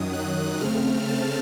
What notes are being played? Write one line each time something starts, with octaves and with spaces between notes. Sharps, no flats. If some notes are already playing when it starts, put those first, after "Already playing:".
Already playing: F#2 D#3 F#3 D#6
F#6
C#3 A3 C4 F6
A5